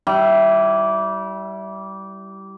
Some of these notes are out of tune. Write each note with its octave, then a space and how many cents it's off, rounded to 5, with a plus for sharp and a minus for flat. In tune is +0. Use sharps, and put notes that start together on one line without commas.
G3 -20 E4 +0